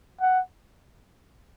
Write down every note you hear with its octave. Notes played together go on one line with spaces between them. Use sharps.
F#5